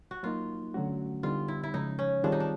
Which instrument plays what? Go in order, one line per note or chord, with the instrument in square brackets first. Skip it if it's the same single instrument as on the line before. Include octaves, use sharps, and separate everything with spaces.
[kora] F#4
[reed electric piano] F#3 A#3 D#4 [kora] F4
[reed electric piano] D3 F#3 A3 C#4 F#4
[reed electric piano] D3 G3 B3 D#4 G4 [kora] F4
[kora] E4
E4
[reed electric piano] C#3 F3 G#3 C#4 [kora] D#4
[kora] C#4
[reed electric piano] D#3 G3 C4 F4 G#4 [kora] D4
[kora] D#4
D4